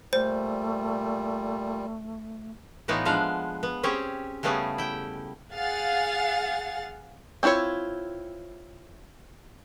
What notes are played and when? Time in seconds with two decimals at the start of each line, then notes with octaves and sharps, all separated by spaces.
0.13 A#2 G3 A3 C5
2.88 A2 E3 B3 D#4 F4 C#5
3.05 F3 G#3 D4 F5 F#5
3.63 B3
3.83 C4 C#4 G4 G#4 C#5
4.43 C#3 G3 A3 B3 C#4 G#4
4.78 E4 G5
5.53 G#4 F5 F#5 A6
7.43 C4 D4 E4 F4 C#5